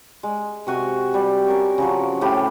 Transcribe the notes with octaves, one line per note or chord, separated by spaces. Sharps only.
G#3
C3 F#4 G#5
G3
C#4 A#4 C#5
C#3 F3 F#3
A2 G4 B5